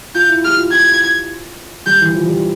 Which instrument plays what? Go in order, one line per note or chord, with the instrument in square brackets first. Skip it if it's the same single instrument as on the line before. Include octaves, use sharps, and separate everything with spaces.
[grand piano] F4 [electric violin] G6
[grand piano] E4
[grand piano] G4 [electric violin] F6
[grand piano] F4
[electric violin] G#6
[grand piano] G3 [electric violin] G6
[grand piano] E3
F3
G3